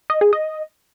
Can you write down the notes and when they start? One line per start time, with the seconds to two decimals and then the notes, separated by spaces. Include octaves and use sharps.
0.10 D#5
0.21 G#4
0.33 D#5